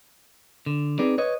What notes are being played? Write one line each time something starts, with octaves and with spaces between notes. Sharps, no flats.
D3
C4 D#4 G#4 B4 D5
B4 C#5 D#5